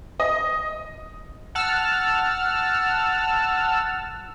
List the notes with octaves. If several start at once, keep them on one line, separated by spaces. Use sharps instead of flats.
D#5
F#5 A5 E6 F6